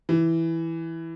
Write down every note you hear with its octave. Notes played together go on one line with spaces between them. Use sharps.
E3